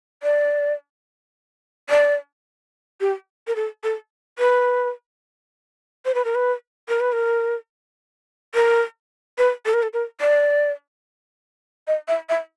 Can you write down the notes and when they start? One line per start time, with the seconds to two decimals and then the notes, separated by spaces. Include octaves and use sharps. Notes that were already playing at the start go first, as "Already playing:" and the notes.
0.23 D5
1.90 D5
3.01 G4
3.47 A#4
3.56 A4
3.84 A4
4.39 B4
6.05 C5
6.14 B4
6.25 A#4
6.35 B4
6.88 A#4
7.00 B4
7.12 A#4
8.55 A#4
9.38 B4
9.66 A4
9.74 A#4
9.83 A4
9.93 A#4
10.21 D5
11.87 D#5
12.08 E5
12.29 E5